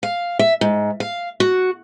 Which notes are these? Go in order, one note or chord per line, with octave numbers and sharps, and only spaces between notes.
F5
E5
G#2
F5
F#4